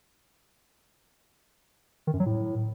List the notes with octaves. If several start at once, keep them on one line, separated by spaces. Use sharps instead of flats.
D#3
F#2
F#3
A2